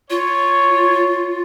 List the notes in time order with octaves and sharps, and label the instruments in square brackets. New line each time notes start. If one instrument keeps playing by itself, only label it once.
[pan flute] F4 [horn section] C#5